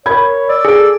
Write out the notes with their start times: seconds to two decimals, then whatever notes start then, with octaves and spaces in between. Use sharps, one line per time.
0.06 A#4 C#5 B5 G#6
0.49 D5 E6
0.65 G#4 A4 D7